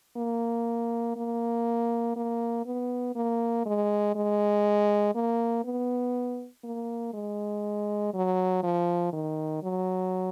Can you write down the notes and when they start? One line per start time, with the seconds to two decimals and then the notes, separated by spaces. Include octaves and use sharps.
0.17 A#3
1.16 A#3
2.16 A#3
2.66 B3
3.16 A#3
3.66 G#3
4.15 G#3
5.15 A#3
5.64 B3
6.64 A#3
7.14 G#3
8.14 F#3
8.63 F3
9.13 D#3
9.63 F#3